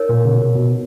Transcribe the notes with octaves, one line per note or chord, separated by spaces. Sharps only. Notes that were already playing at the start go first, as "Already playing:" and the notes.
Already playing: D#4 A#4 C#5
A#2
C#3
B2
B2